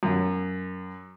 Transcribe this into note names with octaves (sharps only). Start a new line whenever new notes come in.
F#2